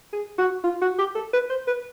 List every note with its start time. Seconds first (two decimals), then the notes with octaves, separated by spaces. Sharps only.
0.13 G#4
0.38 F#4
0.63 F4
0.81 F#4
0.98 G4
1.15 A4
1.33 B4
1.50 C5
1.67 B4